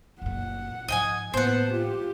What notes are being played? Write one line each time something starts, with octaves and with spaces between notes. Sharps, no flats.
F#1 A#2 F#5
G#2 F3 D#5 G5 G#5
A2 A#3 B3 C5 F#5 A5
F4 G4